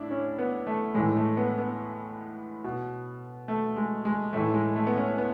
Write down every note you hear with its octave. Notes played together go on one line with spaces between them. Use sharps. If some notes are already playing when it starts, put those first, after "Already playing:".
Already playing: A2 D4 E4
C#4
B3
A3
A2 E3 G#3
A3
B3
B3
B2
A3
G#3
G#3
A2 E3 A3
G#3
A3
B3
C#4
B3